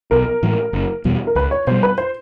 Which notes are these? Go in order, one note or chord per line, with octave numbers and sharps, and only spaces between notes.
B1 A#4
A2 E3 G#3
F#1
E2 B2 G3
A#4
C#2 B4
C#5
B2 G3 C5
B4
C5